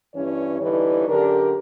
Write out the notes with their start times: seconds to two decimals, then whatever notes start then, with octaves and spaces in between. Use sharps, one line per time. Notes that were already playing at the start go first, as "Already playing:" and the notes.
0.15 G2 E3 C#4 C#5
0.62 D3 E3 G3 D#4 B4 C#5
1.08 F#2 D3 D4 G4 A#4